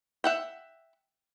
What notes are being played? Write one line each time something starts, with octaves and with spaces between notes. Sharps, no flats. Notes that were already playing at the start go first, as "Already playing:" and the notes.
E5 F#5 G5